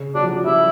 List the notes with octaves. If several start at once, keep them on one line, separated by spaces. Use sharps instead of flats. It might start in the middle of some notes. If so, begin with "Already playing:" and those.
Already playing: C#3
F#3 D4
F3
F#3
G3 E4